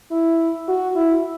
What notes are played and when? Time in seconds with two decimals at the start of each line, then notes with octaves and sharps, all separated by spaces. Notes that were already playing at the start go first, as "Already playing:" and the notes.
0.11 E4
0.68 F#4
0.96 E4